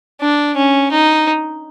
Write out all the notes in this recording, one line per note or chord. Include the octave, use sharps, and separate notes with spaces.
D4
C#4
D#4